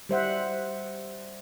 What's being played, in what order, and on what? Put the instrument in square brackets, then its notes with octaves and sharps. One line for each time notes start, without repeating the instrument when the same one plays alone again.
[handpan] G3 C5 E5 F#5